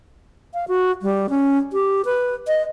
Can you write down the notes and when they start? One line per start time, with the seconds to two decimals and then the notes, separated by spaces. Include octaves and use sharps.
0.54 F5
0.68 F#4
1.02 G3
1.30 C#4
1.73 G4
2.05 B4
2.47 D#5